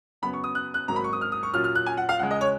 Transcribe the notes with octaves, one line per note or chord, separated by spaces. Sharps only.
F#2 C#3 F#3 B3 B5
C#6
D#6
F#6
F#6
G#1 G#2 F#3 A#3 A#5
B5
C#6
D#6
F6
D#6
C#6
A#2 F#3 C#4 F4 F6
F6
F#6
G#5
F#5
F5
C#2 C#3 G#3 F#5
D#5
C#5